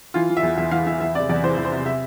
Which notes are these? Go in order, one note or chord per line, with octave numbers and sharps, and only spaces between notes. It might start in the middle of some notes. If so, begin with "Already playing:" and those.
E3 F4
E3
E5
E2
E2 E5
E3 F5
E3 E5
E2 E5
C3 D5
E2 D5
E3 C5
E2
C5
C3
E5